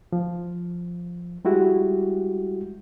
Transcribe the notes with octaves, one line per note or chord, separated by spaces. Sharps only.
F3
G3 G#3 E4 F#4 G4